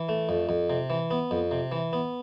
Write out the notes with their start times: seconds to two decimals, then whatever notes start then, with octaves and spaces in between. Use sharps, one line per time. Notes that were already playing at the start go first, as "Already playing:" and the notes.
Already playing: E3
0.09 A3
0.29 F2
0.49 F2
0.70 C3
0.90 E3
1.11 B3
1.31 F2
1.51 C3
1.72 E3
1.93 B3